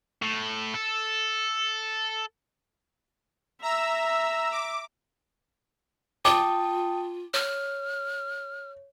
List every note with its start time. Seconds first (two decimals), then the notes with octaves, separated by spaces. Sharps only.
0.22 A2
0.74 A4
3.62 E5 A#5 E6
4.52 D6
6.25 F4 G5 A5 D6 D#6
7.34 C#5 F6